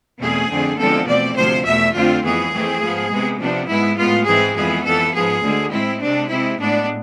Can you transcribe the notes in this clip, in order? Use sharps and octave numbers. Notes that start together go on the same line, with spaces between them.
E2 B2 A3 C4 G#4
F2 D3 A3 C4
E2 D3 F3 G#3 C4 A4
B2 A3 C4 D5
D2 C3 F3 C5
E2 B2 A3 E5
F2 D3 A3 C4 F4
F2 E3 B3 G#4
F2 E3 A3 C4
G#2 F3 B3
C3 G#3 B3
C3 F3 B3 D4
G#2 G#3 B3 E4
A2 G#3 B3 F4
G#2 E3 G#3 C4 G#4
F2 E3 B3 G#4
F2 E3 B3 A4
G#2 F3 B3 G#4
D2 D3 G#3
A2 G#3 C4 E4
C3 G#3 C4 D4
C3 G#3 C4 E4
A2 G#3 B3 D4